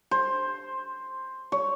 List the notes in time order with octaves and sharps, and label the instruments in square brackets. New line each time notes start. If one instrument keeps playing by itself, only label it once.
[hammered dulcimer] C5
C#5